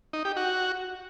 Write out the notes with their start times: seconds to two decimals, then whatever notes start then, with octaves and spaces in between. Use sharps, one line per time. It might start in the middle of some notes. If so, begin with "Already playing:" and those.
0.13 D#4
0.25 G4
0.37 F#4